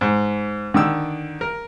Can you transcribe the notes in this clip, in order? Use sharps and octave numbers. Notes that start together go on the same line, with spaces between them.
G#2
D3 D#3 E6
A#4